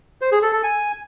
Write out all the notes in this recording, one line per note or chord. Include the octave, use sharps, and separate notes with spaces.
C5
G#4
A4
A4
G#5